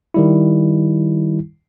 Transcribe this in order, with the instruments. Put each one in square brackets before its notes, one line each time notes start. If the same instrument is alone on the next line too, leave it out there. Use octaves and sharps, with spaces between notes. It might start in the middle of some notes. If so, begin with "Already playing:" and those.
[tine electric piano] D#3 G3 E4